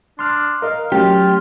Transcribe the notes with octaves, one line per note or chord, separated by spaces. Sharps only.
D4 C6 F6
A#4 D#5 F5
F#3 A3 C#4 F4 G4